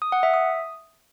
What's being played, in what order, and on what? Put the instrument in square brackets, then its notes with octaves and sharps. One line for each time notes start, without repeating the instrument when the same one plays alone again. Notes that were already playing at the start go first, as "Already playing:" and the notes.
[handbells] D#6
F#5
E5
D#6